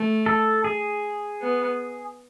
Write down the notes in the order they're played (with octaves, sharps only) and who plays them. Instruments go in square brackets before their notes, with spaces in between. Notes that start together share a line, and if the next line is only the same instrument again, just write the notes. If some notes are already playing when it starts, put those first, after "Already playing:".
Already playing: [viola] A3
[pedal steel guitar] A4
G#4
[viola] B3